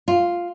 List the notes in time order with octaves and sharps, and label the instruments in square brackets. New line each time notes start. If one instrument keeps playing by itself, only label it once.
[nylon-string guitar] F4